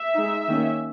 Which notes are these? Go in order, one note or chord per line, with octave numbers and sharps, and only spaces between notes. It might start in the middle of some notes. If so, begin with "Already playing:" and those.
Already playing: E5
G#3 D#4
D#3 A#3 C#4